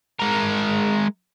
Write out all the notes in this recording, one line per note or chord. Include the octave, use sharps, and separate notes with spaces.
G#3 A#4